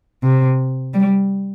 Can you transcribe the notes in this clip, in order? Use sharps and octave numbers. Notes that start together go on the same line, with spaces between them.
C3
G3